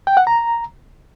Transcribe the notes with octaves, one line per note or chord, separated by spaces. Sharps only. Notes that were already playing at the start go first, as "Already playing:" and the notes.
G5
F#5
A#5